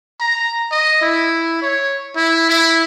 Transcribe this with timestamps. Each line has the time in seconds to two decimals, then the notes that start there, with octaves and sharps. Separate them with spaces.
0.21 A#5
0.72 D#5
1.02 E4
1.63 C#5
2.16 E4
2.50 E4